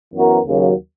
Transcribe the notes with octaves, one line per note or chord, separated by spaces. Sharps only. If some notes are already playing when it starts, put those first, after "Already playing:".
F#2 E3 B3 F#4 A#4
D#2 C#3 F#3 A#3